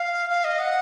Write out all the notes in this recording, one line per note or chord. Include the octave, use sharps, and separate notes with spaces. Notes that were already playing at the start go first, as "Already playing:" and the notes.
Already playing: F5
F5
D#5
F#5